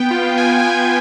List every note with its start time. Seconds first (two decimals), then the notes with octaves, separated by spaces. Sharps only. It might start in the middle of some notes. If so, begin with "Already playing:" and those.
Already playing: B3 G5
0.11 F4
0.37 F4 G#5
0.59 G#5
0.64 F4 G5